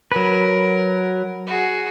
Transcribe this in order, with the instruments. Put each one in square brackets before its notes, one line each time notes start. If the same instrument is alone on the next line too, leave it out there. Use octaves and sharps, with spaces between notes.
[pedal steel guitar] F#3 B4 [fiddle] A#4
[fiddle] F#4 G#4